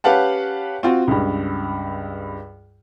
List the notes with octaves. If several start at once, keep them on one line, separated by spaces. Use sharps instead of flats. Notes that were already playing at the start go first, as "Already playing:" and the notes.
C#4 G4 B4 F5 F#5 A5
C4 F4 F#4
C#2 G2